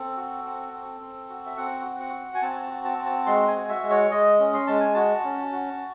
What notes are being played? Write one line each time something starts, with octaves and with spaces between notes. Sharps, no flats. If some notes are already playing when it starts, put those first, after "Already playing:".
Already playing: C4 A4
F#4
C4
C4
C4
F#4
E5
C4 F#5
F#4
F#5
F#4
G#5
C4 A5
A5
F#4
A5
C4
A5
G#3 C6
G#5
F#4
E5
G#3
C#5
G#3 D#5
C#4
C6
G#3 A5
G#5
F#4 A5
C#4
F#4